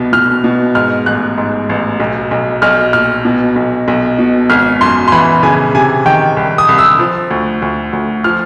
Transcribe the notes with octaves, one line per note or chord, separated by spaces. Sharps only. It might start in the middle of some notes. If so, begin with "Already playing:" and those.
Already playing: C2 B2
B2 F6
B2
G#2 F6
A1 F#6
G#2
A1
B1
B1
B1 F6
A#2 F6
B2
B1
B1
B2
G#1 F6
F#2 C6
C6
E3 B5
C#3 G#5
C3 G#5
D#3 G5
C2
D#6
C2
E6
F3
D2
D2
D2
F3 F6